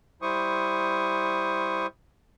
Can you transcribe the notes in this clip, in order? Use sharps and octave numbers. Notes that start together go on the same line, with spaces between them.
G3 E4 C5 C#6 D#6